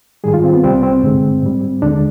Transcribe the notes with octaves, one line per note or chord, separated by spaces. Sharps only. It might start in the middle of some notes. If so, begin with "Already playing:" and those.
G#2 D#3 G3 G#4
F4
C4
B3
C2 C3 G3 C4
C4
G2 D3 G#3
G#2 G3
D#2 D3 G#3 D4